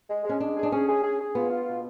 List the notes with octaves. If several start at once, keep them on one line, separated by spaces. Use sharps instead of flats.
G#3
G#3
C#4
G#3 D4
G#4
D4
C#4 G#4
G#4
G#4
G#4
B3 F4
F4
B2